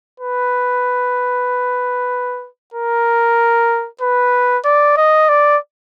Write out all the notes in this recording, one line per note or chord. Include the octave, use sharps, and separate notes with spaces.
B4
A#4
B4
D5
D#5
D5